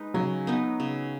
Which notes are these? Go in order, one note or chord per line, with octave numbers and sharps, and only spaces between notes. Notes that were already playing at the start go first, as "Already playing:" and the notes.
Already playing: G#3 D#4 B4
C#3 F#3
B3 D#4 B4
C#3